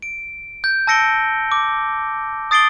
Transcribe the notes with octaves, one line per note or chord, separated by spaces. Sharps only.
D7
G6
A5 E6 A#6 C#7 D7 G7
D6
D#6 A6 C7 D7 F#7 G7